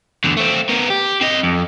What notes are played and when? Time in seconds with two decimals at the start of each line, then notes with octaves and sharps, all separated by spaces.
0.24 E2 D3
0.37 A3 C4
0.69 B3 A#4
0.90 G4
1.21 C4 D#5
1.43 F2